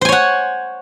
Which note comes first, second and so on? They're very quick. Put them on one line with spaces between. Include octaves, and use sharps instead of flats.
C5 G#5 C#5 F#5